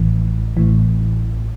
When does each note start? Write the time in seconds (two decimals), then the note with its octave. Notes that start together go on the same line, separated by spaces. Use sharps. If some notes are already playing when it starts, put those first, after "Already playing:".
Already playing: A1 A2 E3
0.57 A1 A2 E3